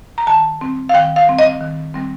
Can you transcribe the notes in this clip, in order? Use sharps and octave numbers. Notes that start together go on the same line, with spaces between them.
A#5
D#3 A5
G3 C4
F5
D#3 G5
F5
G3 C4
D#5
D#3
G3 C4